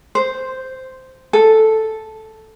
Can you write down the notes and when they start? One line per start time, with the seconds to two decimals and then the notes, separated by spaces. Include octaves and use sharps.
0.15 C5
1.33 A4